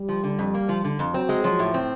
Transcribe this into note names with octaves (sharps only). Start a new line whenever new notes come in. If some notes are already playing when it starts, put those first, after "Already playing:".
Already playing: G3
F3
D3
F2
A#3
F3
D3
F2
F#3 C4
G#3
F3 F#3
A2
C4